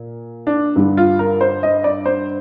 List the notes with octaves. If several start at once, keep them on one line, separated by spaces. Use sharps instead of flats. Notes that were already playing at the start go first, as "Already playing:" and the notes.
Already playing: A#2
D4
G2 D3 G3
F4
A#4
C5
D#5
D5
C5